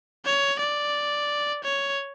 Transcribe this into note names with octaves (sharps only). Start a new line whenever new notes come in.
C#5
D5
C#5